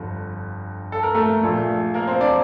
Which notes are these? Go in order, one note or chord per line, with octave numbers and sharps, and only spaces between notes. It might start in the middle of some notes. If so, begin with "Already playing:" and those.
Already playing: G1 F2 D3
A4
A#4
A3 A4
A#1 A#2 A3
A#3 A#4
C4 C5
D4 D5